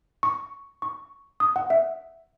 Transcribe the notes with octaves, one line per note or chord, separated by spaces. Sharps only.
C#6
C#6
D#6
F#5
E5